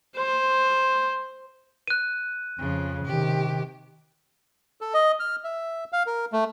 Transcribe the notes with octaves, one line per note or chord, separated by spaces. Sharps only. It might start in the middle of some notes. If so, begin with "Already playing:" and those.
C5
F#6 D#7
F2 C#3 F3
C3 D#3 G4
A4
D#5
F6
E5
F5
A#4
A3